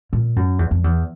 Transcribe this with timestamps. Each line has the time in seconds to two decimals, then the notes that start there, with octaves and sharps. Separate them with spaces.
0.13 A#2
0.36 F#2
0.59 E2
0.71 F2
0.84 E2